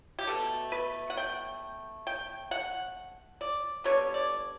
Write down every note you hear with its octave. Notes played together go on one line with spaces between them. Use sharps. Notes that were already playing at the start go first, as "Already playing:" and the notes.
G4
B2 A3 A4
B4
F#5
G5
G5
F#5
D5
D3 G3 B3 C#5
D5